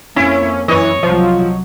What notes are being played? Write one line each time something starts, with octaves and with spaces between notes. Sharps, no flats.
F2 A#3 C#4 E4
F#2 E3 C#5 D#5
C2 F3 F#3